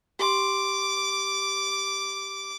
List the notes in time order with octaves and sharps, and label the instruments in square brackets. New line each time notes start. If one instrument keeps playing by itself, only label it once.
[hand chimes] G4 C6 [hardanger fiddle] D6